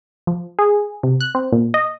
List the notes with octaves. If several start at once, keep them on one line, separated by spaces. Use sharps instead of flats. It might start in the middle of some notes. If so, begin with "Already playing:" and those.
F3
G#4
C3
F#6
C4
A#2
D#5